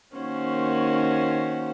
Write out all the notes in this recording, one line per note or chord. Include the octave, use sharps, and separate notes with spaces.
D#3 A#3 C#4 F#4 C5